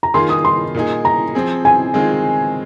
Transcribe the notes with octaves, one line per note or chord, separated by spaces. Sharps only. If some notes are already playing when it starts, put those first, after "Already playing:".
A#5
D#3 A#3 F4 G#4 C6
D#6
C6
A#2 A#3 D#4 G#4
A#5
F3 C4 G#4
G#5
D#3 G#3 C4 F4 G#4